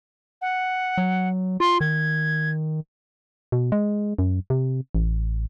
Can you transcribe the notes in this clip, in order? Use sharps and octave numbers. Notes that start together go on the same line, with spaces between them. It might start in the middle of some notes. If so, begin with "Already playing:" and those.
F#5
F#3
F4 C6
D#3 G#6
B2
G#3
F#2
C3
A1